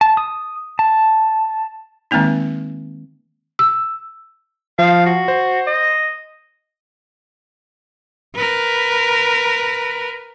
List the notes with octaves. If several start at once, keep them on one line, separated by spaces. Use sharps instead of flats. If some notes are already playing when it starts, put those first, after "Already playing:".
A5
D#6
A5
D#3 G#3 A#3 C4 D#4
E6
F3 F5
F#4
C5
D#5
A#4 B4